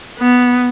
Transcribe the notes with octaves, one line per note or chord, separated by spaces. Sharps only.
B3